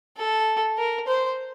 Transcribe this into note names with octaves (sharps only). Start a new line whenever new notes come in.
A4
A#4
C5